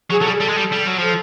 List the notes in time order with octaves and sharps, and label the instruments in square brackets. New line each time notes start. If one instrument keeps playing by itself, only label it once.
[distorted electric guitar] F#3 [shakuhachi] G#4
[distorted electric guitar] F#3 [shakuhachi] A4
[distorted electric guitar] G3
[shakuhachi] G#4
[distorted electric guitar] G3 [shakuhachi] A4
[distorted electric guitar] G#3
G3
G3
F#3
[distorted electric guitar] F3 [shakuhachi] A4